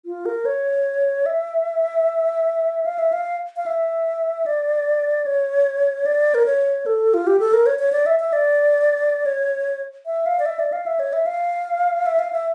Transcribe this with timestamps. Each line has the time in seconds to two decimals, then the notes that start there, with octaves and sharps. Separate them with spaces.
0.06 F4
0.26 A#4
0.45 C#5
1.26 E5
2.86 F5
2.99 E5
3.12 F5
3.56 F5
3.66 E5
4.46 D5
5.26 C#5
6.06 D5
6.34 A#4
6.46 C#5
6.86 A4
7.14 F4
7.27 G4
7.40 A4
7.53 A#4
7.66 C#5
7.79 C#5
7.92 D5
8.06 E5
8.20 E5
8.33 D5
9.26 C#5
10.06 E5
10.26 F5
10.40 D5
10.46 E5
10.59 D5
10.72 F5
10.86 E5
11.00 C#5
11.13 E5
11.26 F5
12.06 E5
12.19 F5
12.33 E5